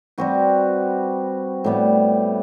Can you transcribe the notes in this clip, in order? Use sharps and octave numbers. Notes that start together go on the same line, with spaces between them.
G3 C4 F#4 B4
A2 G3 B3